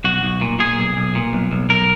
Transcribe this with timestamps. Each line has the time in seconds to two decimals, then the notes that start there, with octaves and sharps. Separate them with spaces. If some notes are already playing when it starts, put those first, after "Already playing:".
0.04 B1 F#4
0.23 B1
0.41 A#2
0.59 A#2 G#4
0.77 B1
0.97 B1
1.15 A#2
1.33 B1
1.51 B1
1.69 B1 A#4